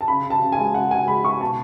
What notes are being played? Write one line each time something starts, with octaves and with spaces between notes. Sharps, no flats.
A5
C#3 B5
C#3
A5
C#3
G#5
G#3
C#3 F#5
C#3 G#5
G#3 B5
C#3 C#6
B2 A5